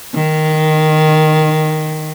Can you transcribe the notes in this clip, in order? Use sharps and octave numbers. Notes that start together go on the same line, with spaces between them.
D#3